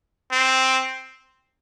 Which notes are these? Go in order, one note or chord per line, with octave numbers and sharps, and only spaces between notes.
C4